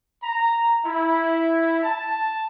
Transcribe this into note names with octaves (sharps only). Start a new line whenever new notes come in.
A#5
E4
A5